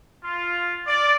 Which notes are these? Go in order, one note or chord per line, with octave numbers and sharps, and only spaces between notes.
F4
D5